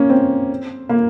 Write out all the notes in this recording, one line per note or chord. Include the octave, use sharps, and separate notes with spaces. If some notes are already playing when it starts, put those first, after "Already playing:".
Already playing: A#3 C#4
C4
A#3